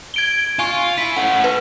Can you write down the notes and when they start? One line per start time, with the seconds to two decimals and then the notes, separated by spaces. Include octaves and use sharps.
0.14 G#6 D7 G7
0.59 F4 G#5 C#6
0.98 E4 B6
1.16 A3 C#4 F#5
1.44 B4